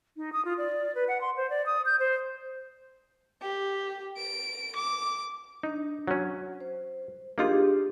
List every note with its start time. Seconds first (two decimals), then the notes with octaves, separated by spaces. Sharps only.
0.17 D#4
0.33 D#6
0.45 F4
0.58 D5
0.95 B4
1.08 F#5
1.21 C6
1.37 C5
1.50 D5
1.66 D#6
1.86 G6
2.00 C5
3.42 G4
4.17 D7
4.76 D6
5.63 D4 D#4
6.07 F#3 C#4
6.60 C5
7.38 A#3 D4 D#4 F4 G4 G#4